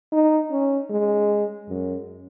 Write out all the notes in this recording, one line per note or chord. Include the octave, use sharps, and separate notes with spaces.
D#4
C#4
G#3
F#2